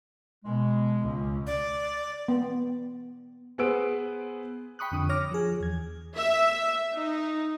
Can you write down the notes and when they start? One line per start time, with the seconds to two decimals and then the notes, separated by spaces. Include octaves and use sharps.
0.45 B2 G#3
1.01 C#2
1.47 D5
2.28 B3
3.58 B3 G#4 B4 C5 E6 D7
4.79 G5 B5 C#6 D#6 F#6
4.92 F2 D3 D#6
5.09 C#5 D6 F6 A#6
5.31 F3 G#4
5.60 E2 G#6
6.16 E5
6.95 D#4